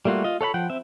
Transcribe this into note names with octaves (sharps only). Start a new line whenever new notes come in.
G3 A3 A#3 F4 F#4
F4 D#5
A4 C#5 F#5 B5
F3 F#5 G5
C4 E5